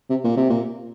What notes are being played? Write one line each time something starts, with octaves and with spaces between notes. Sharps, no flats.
C3
A#2
C3
A#2